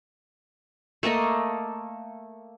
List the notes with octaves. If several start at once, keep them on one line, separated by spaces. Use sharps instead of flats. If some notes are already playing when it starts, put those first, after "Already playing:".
A3 A#3 A4 D#5